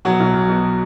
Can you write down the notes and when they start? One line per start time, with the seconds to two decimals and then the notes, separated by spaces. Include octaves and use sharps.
0.05 B2 F#3 F#4
0.20 B1
0.34 B1
0.49 B2